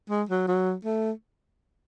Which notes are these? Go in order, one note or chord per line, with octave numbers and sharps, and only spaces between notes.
G#3
F#3
F#3
A3